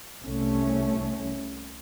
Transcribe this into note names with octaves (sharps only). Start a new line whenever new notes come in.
C2 A3 C#4